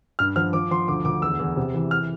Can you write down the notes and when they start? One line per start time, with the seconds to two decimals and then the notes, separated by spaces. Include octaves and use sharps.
0.19 G2 F6
0.36 F3 F6
0.53 F3 D6
0.71 F3 C6
0.88 D2 D6
1.05 D2 D6
1.22 E2 E6
1.39 E2
1.57 C3
1.74 E3
1.91 F6